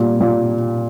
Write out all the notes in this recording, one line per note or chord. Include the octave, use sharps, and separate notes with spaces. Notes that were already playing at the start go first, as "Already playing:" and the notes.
Already playing: A#2 G3
A#2